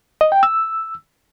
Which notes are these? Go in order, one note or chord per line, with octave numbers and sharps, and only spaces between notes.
D#5
G5
E6